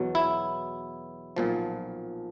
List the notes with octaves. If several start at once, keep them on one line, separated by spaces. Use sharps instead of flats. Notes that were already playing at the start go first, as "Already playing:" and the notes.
Already playing: E2 B2 F#3
E4
B1 A#2 F3